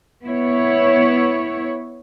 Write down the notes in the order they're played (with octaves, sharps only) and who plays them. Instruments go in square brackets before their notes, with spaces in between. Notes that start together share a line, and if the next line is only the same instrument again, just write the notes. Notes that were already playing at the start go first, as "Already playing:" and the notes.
[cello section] B3 E4 C#5